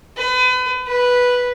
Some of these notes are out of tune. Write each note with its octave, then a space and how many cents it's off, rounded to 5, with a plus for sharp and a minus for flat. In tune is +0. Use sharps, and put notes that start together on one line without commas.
B4 +35
B4 -5